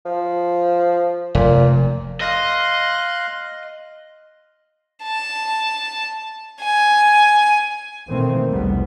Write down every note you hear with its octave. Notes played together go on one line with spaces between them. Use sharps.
F3
F1 A#2
D#5 F5 C6 F#6
A5
G#5
B2 D#3 E3 A3 A#3 C4
F1 B1 E2 G#2 G3 B3